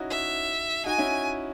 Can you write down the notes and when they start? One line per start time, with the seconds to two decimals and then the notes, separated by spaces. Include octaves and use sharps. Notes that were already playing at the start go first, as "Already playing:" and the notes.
Already playing: C#4 D#4 E4 F#4
0.10 E5
0.85 D#4 F#4 G#5
0.98 C#4 E4